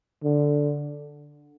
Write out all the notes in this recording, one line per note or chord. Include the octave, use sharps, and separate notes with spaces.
D3